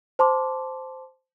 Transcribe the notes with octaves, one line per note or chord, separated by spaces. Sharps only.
C5 A5 C6 D6